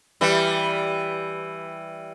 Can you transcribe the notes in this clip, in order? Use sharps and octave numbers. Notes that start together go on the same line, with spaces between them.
E3 G3